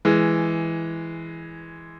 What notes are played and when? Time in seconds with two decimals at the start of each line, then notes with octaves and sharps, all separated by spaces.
0.05 E3 G#3